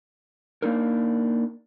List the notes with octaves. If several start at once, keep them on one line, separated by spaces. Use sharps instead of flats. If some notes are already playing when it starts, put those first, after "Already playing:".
A#3 D4 D#4 A#4